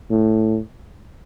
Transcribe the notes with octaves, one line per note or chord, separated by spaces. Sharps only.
A2